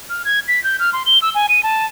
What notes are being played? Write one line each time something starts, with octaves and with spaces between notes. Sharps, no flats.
F6
G#6
B6
G6
F6
C6
G7
E6
G#5
D#7
A5